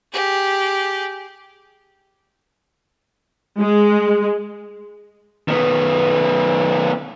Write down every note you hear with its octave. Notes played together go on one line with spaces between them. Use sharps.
G4 G#4
G#3
D#3 B3